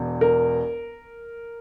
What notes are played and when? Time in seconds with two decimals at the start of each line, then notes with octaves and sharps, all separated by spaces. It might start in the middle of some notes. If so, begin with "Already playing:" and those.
Already playing: E1 E2
0.21 A#4